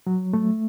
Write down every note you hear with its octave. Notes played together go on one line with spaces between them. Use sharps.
F#3
A3